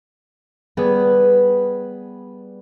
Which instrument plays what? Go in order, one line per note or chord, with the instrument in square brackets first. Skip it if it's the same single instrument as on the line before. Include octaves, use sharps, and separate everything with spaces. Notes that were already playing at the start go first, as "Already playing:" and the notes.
[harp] G3 B3 G#4 B4